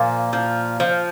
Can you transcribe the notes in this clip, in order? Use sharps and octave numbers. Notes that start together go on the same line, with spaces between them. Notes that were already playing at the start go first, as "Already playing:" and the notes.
Already playing: A#2 F3 G#5
F3
F3